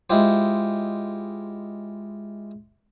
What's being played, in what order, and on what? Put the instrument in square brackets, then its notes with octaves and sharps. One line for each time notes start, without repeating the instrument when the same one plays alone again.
[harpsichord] G#3 E4 F4 G4 C5